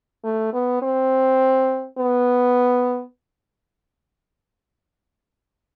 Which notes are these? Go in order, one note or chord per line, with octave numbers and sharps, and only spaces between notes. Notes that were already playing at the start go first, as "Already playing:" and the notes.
A3
B3
C4
B3